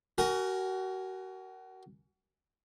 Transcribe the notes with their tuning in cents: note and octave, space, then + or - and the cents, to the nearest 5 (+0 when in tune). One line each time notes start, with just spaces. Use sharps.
F#4 +30 A#4 +0 G#5 +0